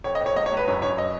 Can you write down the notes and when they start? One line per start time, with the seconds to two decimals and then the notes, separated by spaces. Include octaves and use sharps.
0.04 F2 C#5
0.15 D#5
0.20 F2
0.26 C#5
0.36 C#2 D#5
0.46 C#5
0.52 C#2
0.57 B4
0.68 F#2 C#5
0.82 F#2 C#5
0.98 D#5